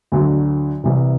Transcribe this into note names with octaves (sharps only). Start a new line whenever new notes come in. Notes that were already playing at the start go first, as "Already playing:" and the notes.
D2 D3 F#3
C2 C3 E3